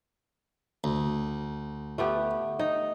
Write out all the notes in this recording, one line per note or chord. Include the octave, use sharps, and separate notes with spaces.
D2
A3 B3 G4
D#4